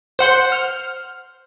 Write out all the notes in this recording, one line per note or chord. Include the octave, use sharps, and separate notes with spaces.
C5 F#5 C6
F6